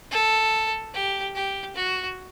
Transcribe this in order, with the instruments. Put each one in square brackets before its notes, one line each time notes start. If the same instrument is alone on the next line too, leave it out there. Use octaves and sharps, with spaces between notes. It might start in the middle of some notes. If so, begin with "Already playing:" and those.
[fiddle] A4
G4
G4
F#4